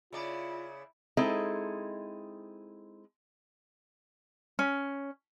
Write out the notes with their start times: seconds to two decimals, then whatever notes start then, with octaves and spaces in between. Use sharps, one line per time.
0.13 C#3 E4 F4 D5
1.17 G#3 C4 D#4 E4 A4
4.59 C#4